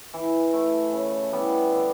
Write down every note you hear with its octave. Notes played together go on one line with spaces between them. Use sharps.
E3
A3 E4
C#3
E3 G3 B3
D3